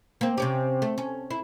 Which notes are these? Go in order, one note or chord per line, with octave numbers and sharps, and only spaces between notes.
A#3 C4
C3 C#4 G4
A3
C#4
E4